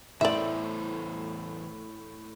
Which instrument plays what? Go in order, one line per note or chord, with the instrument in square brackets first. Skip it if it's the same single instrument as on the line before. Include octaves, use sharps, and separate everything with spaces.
[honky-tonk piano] A2 [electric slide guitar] E3 B3 C5 [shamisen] D5 E5